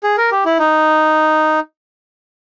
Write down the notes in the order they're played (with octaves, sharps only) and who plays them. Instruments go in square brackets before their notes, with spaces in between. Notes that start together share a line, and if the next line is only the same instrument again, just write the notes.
[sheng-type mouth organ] G#4
A#4
G4
E4
D#4